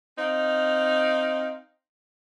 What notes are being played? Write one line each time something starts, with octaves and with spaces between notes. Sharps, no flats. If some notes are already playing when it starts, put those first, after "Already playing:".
C4 D#4 F5